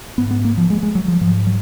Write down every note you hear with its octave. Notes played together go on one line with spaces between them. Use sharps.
G#2 B3
B3
A#3
F3
G#3
G#3
F#3
F3
G#2 F3
F#3